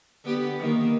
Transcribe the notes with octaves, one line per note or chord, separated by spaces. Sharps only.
D3 B3 G4
D#3 A#3